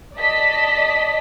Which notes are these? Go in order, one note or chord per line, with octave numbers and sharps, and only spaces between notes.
D5 D#5 A5 B6